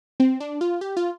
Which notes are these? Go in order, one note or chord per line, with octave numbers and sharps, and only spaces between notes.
C4
D4
F4
G4
F4